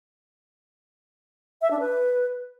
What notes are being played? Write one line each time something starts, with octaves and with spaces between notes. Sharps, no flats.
E5
D4
B4